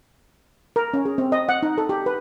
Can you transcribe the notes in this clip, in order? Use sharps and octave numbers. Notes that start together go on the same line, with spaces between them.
A#4
C#4
G#4
C4
D#5
F#5
D#4
A4
G4
B4